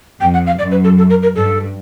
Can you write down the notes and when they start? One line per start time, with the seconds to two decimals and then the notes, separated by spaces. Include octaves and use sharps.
0.21 F2 G5
0.34 F#5
0.46 F5
0.59 F#2 D5
0.71 B4
0.84 A4
0.98 A4
1.10 A#4
1.23 A#4
1.35 G2 A4